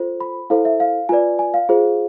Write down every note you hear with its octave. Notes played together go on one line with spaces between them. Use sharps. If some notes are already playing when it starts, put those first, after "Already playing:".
Already playing: F4 A4 C5
B5
E4 A4 C5 F5
E5
F5
F4 B4 D5 G#5
G#5
F5
F4 G#4 C5